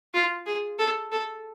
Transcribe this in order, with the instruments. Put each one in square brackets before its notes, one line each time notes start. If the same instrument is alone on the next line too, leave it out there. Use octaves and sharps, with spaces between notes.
[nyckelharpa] F4
G#4
A4
A4